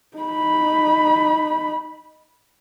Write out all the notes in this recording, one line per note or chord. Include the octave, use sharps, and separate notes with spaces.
D#4 B5